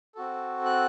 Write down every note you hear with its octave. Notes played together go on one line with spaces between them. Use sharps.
C4 F#4 A4
F#6